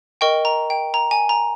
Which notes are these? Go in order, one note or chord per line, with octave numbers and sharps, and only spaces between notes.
A#4 D#5 G5 C#6
A#5
G5
A#5
G#5
A#5